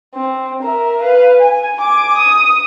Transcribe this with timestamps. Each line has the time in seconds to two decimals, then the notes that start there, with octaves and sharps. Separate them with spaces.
0.15 C4
0.63 A#4 E5
1.02 B4 F5
1.40 G#5
1.80 G#5 D6
2.18 D#6